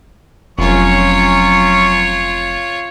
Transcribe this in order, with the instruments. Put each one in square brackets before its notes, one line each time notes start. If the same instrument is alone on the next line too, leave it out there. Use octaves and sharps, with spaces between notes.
[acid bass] F1 [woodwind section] F#3 C#4 C#6 [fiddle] F4 C#5